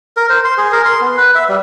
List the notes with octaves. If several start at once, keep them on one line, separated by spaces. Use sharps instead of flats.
A#4
C5
C6
G#4
A#4
C6
B3
B4
E5
G3